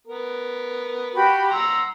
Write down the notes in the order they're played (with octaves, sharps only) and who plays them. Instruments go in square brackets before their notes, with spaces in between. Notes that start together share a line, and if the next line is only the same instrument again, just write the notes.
[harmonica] B3 A#4
[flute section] F#4 G4 B5
[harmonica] F#5 A#5 C6 [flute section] E6